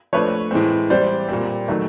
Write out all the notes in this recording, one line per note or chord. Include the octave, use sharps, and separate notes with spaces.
F3 A3 D4 B4 C#5
A2 E3 G#3 C4
E3 G3 C4 C5 D5
A#2 G3 C4
D#3 F#3 A3